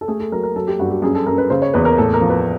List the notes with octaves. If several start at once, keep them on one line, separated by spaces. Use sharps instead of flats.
A4
A3 G#4
A4
F#3 A#4
A#4
F#3 A4
G4
G2 F#4
G4
F#2 G#4
A4
F#2 A#4
B4
C#3 C5
C#5
E2 B4
A#4
A2 A4
A#4
F3
B4